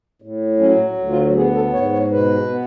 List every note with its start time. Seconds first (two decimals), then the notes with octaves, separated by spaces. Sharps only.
0.22 A2
0.60 F#3 C#4
0.98 D2
1.10 F4
1.35 B3 G#4
1.55 A4
1.73 G#2 C#5
1.92 C#5
2.11 B2 B4
2.49 B3